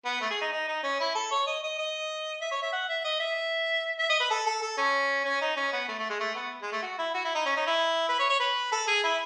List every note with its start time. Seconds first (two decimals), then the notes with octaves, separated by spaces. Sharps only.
0.06 B3
0.21 A3
0.31 G#4
0.41 D#4
0.52 D#4
0.68 D#4
0.83 C#4
1.00 E4
1.15 A4
1.31 C#5
1.47 D#5
1.63 D#5
1.79 D#5
2.41 E5
2.52 C#5
2.63 E5
2.73 F#5
2.89 E5
3.05 D#5
3.20 E5
3.99 E5
4.10 D#5
4.20 B4
4.31 A4
4.47 A4
4.62 A4
4.78 C#4
5.25 C#4
5.42 D#4
5.57 C#4
5.73 B3
5.89 A3
5.99 A3
6.10 G#3
6.20 A3
6.35 B3
6.62 G#3
6.72 A3
6.82 F#4
6.99 E4
7.15 F#4
7.25 E4
7.35 D#4
7.46 C#4
7.57 D#4
7.67 E4
8.09 B4
8.20 C#5
8.30 C#5
8.40 B4
8.72 A4
8.88 G#4
9.04 E4